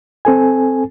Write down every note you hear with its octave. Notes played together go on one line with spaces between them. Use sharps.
C4 A4 G#5